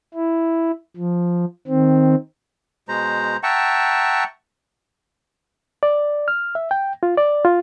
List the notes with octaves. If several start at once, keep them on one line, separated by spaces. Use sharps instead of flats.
E4
F3
D#3 C4
B2 G#3 C5 A#5
E5 F#5 G5 A5 A#5 C#6
D5
F6
E5
G5
F4
D5
F4